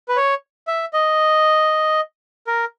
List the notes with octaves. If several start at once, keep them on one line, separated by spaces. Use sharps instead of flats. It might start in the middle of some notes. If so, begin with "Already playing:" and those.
B4
C#5
E5
D#5
A#4